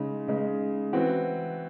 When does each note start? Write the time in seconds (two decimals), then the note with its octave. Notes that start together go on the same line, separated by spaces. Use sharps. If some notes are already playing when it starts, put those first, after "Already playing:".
Already playing: C#3 G#3 D#4
0.28 C#3 G#3 D#4
0.93 E3 C4 F#4